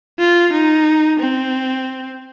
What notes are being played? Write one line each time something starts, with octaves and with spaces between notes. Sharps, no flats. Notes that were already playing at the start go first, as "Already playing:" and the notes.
F4
D#4
C4